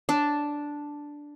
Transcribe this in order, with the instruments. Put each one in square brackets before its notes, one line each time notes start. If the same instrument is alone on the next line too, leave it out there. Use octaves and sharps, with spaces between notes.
[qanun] D4